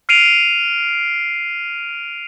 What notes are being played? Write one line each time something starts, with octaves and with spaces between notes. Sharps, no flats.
F6 C7 D7 D#7 F7